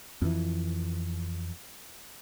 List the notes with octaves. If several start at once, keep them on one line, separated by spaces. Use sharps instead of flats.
F2 E3